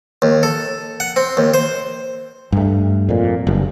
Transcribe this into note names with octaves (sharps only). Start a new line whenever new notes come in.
D#2
A4
F#5
C4
D#2
C5
G2 A3
F2 A#2
F#1 G2